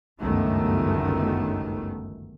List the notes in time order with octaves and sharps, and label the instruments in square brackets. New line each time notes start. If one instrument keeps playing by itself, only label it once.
[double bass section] G1 C#2 F#2 D#3 A3 B3